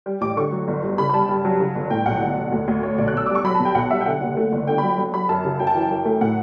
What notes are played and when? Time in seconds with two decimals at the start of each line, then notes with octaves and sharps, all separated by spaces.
0.06 G3
0.21 A1 D6
0.36 D3 C#6
0.52 F#3
0.68 G1
0.83 G2
0.98 C#3 B5
1.10 B5
1.13 G3 A5
1.29 G2
1.45 F#3
1.60 C#3
1.75 G1
1.90 A2 G5
2.06 B1 F#5
2.21 G1
2.37 G1
2.52 D2
2.68 D2
2.83 A3 C#5
2.98 B1 D5
3.08 F#6
3.13 B1 E6
3.26 G3 D6
3.35 C#6
3.44 F#3 B5
3.55 A5
3.60 B2
3.65 G5
3.75 B1 F#5
3.91 G3 E5
4.01 G5
4.06 D3 F#5
4.21 F#1
4.37 A3
4.52 G1
4.67 D3 G5
4.78 B5
4.83 F#3
4.98 F#3
5.14 F#3 B5
5.29 F#2 A5
5.45 C#3
5.60 F#2 G5
5.67 A5
5.75 E3 G5
5.91 F#2
6.05 A3
6.21 A2 F#5